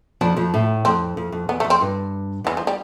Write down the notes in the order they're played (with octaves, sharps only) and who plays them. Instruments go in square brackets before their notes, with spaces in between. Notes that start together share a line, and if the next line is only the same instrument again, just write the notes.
[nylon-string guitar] F2 F3 [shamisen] D4
[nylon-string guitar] F2 F3
A2
[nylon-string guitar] F2 [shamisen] C4
[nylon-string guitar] F2
F2
[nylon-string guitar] E2 [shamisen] B3
[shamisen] A3
[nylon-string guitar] F2
[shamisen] C4
[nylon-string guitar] G2
[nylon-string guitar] E2 [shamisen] E3
[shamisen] F3
G3